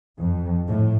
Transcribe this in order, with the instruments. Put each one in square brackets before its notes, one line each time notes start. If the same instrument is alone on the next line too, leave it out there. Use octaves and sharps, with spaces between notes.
[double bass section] F2
A2